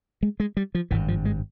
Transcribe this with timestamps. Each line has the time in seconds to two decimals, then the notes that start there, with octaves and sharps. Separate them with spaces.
0.23 G#3
0.40 G#3
0.57 G3
0.75 F3
0.91 G#1 G2 E3
1.08 F3
1.25 G#3